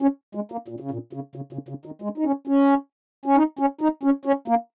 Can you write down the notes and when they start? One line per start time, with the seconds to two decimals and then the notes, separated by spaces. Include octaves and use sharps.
0.02 C#4
0.35 G#3
0.52 A#3
0.68 A#2
0.80 C#3
0.91 A#2
1.13 C#3
1.36 C#3
1.53 C#3
1.69 C#3
1.86 D#3
2.02 G#3
2.18 D#4
2.25 C#4
2.48 C#4
3.26 C#4
3.36 D#4
3.59 C#4
3.81 D#4
4.03 C#4
4.25 C#4
4.48 A#3